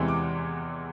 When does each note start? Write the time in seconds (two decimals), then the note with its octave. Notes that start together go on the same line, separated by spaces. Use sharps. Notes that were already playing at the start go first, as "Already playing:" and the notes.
Already playing: E2 C3 E3 G#3
0.08 D6